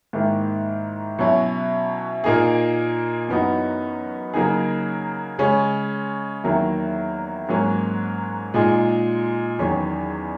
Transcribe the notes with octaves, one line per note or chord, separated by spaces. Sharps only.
G#2 D#3 A#3 E4
B2 F#3 C#4 E4
A#2 A#3 D#4 G#4
F#2 E3 B3 D#4 F#4
C#3 F#3 A#3 D#4 G#4
C#3 G#3 C#4
E2 D#3 F#3 A#3 E4
G#2 F#3 A#3 C#4
A#2 G#3 D#4 G#4
E2 D#3 F#3 C#4 G#4